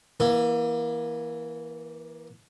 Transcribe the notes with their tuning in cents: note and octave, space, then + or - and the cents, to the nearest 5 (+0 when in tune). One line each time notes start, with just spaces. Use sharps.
E3 +0 A#3 +30 E5 +35